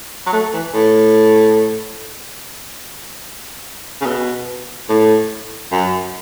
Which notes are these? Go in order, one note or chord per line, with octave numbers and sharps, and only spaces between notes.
F#3
A3
E3
A2
C#3
B2
A2
F#2